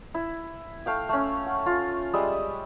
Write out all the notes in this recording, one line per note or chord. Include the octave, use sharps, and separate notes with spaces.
E4
A3 F5 G5
A3 C#4
F#5
F4
G3 G#3 D#5 E5